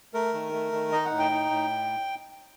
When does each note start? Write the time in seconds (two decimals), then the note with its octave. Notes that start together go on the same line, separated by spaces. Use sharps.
0.14 A3 A#4
0.34 D#3
0.53 A3
0.72 D#3
0.92 D#4 D#5
1.05 F#5
1.11 A2
1.19 G5
1.31 D#4
1.51 A2